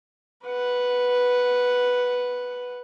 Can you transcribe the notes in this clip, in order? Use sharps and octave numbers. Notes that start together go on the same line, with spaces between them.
B4 F#5